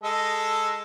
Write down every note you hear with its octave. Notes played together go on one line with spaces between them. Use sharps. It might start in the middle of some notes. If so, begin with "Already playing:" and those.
G#3 A4 D#5